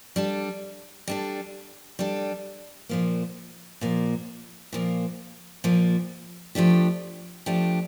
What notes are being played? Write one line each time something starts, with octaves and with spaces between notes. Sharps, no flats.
G3 D4 A4
G3 D4 A4
G3 D4 A4
A#2 F3 A#3
A#2 F3 A#3
A#2 F3 A#3
A#2 F3 A#3
F3 A3 D4 G4
F3 A3 D4 G4